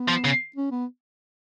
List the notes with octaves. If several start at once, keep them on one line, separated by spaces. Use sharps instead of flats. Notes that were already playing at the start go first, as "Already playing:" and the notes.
Already playing: B3
F3
C#3
C#4
B3